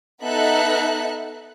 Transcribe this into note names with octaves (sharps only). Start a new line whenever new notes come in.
B3 D#4 A4 E5 F#6